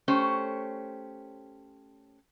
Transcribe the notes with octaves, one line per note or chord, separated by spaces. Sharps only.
A3 C#4 G4 C5